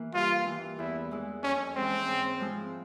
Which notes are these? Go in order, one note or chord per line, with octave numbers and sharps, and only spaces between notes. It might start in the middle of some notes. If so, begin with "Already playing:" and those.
Already playing: E3 A#3
G2 F4
E3 A#3
E2 E4
E3 G#3 E4
F2 C#4
E3 G#3 C4 C#4
G#2
F3 G#3 C4 E4